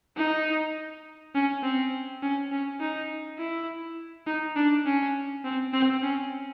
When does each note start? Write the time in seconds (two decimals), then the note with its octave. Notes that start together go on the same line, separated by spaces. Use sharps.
0.17 D#4
1.35 C#4
1.63 C4
2.22 C#4
2.52 C#4
2.80 D#4
3.39 E4
4.27 D#4
4.56 D4
4.86 C#4
5.44 C4
5.73 C4
6.03 C#4